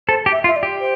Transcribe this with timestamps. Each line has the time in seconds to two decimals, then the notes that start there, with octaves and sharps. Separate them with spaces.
0.08 A4 C5
0.26 G4
0.32 E5
0.44 F4
0.47 E5
0.56 D5
0.63 G4
0.80 C5